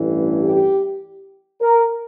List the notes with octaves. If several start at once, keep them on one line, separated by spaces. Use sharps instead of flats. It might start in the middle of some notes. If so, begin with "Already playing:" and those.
Already playing: A1 G2 E3
G4
A#4